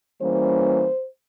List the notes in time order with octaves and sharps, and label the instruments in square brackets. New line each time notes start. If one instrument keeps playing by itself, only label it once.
[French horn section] E3 G3 A#3 C#4 C5